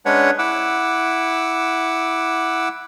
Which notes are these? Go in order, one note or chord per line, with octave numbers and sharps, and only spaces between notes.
G#3 C#4 D4 B4 C#5 F#5
E4 F#5 D6 E6